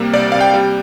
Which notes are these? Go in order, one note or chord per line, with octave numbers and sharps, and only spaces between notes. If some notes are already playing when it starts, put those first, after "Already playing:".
Already playing: C3 G3 A#3
C2 D5
C3 F5
G5
G3